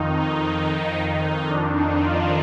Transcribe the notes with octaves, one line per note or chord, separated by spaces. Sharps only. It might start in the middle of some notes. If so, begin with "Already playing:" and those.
Already playing: F2 D#3 D#4
D#4
D#4
D#4
F2 D#3 D4
D#4
F4